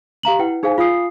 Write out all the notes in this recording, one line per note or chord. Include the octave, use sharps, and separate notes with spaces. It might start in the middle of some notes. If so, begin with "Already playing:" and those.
G4 F5 A#5 F#7
E4 B4 F#5 G5
D#4 G#4 C5 F5 G#5
F4 F5 G#5 D#6 C7